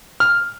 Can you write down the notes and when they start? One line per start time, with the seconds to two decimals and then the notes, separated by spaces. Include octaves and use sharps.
0.20 F6